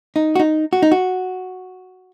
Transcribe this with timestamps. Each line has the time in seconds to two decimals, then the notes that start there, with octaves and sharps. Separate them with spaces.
0.16 D#4
0.36 F#4
0.39 D#4
0.73 F#4
0.82 D#4
0.92 F#4